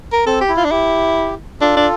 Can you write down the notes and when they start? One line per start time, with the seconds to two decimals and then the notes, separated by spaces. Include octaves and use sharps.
0.13 A#4
0.26 C4 A4
0.41 G4
0.49 E4
0.57 F4
0.64 D4
0.71 E4 G4
1.61 D4 F4 A4
1.77 D4